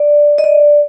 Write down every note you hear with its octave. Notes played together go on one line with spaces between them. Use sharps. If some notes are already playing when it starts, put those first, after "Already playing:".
Already playing: D5
D#5
D5